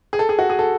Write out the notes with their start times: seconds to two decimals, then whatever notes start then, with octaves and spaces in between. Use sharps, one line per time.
0.13 G#4
0.19 A4
0.29 G#4
0.39 F#4
0.50 G#4
0.59 A4